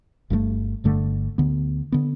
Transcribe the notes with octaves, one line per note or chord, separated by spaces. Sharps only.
G1 G2 D3 A3
G1 G2 D3 A3
D2 D3 B3
D3 B3